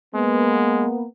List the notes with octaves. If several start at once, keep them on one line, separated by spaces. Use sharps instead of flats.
G#3 A#3 B3